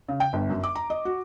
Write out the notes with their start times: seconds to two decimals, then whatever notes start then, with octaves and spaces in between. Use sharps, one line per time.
0.09 C#3
0.20 G5
0.33 G1
0.49 F#2
0.63 D6
0.75 A#5
0.90 D#5
1.05 F#4